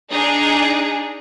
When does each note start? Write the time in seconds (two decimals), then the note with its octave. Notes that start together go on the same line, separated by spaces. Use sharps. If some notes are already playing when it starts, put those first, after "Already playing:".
0.11 D4 D#4 G#4